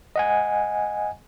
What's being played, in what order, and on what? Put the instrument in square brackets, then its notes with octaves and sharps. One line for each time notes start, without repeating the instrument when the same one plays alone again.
[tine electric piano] D#5 F#5 G#5